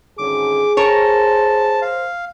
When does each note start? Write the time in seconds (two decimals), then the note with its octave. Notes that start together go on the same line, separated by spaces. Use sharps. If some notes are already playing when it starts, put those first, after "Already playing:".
0.18 G#1 D3 C#4 G#4 D6
0.77 A#4 C5 C#5 A5
1.82 F5